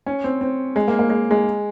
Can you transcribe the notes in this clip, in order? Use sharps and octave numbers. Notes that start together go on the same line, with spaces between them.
C#4
C4
C4
G#3
A#3
A#3
G#3
G#3